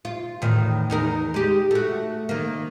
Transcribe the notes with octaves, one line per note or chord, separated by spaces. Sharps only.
F4
E2 A2 D#3
E2 D#4 A#4
G#3 G4
A3 F#4
D#3 A#3